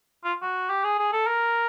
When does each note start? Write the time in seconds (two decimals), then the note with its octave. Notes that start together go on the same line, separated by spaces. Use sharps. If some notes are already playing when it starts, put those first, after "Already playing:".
0.24 F4
0.42 F#4
0.70 G4
0.84 G#4
0.99 G#4
1.12 A4
1.27 A#4